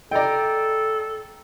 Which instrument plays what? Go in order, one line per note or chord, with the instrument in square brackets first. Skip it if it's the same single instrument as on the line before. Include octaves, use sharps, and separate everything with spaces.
[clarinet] A4 [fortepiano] D5 D#5 [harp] G5 A#5